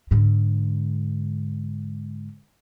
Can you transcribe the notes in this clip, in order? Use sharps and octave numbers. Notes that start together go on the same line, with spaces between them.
G#2 D3